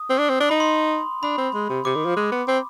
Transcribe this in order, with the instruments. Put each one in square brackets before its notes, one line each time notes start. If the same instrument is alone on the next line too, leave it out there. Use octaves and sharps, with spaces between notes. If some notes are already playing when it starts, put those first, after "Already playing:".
Already playing: [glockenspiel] D#6
[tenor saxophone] C4
D4
C4
D4
[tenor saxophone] D#4 [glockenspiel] B5
[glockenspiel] C6
[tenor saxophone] D4 [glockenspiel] B5
[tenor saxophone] C4
G#3
C3
[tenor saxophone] C3 [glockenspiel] D6
[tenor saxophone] D#3
F3
G#3
B3
C4